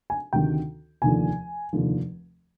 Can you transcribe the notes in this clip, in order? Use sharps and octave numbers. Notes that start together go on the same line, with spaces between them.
G#5
D2 C3 D#3 G5
F1 D#2 D3 F3 G#5
F1 D#2 D3 F3